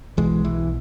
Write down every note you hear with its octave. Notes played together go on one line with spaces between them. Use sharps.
B1 B2 E3 G#3
E3